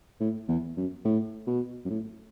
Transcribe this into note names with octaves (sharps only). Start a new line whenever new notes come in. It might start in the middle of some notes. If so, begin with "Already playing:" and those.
A2
E2
F#2
A2
B2
F#2
A2